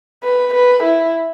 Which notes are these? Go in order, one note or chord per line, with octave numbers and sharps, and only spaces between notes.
B4
B4
E4